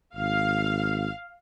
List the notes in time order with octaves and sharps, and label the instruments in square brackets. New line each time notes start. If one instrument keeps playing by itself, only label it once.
[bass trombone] G#1 [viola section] F5